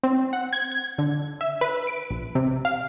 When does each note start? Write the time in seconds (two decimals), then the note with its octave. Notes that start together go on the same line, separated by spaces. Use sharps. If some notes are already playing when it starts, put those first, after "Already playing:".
0.03 C4
0.33 F#5
0.53 G#6
0.72 G#6
0.98 D3
1.41 E5
1.61 B4
1.87 D7
2.10 A#1
2.35 C3
2.65 F5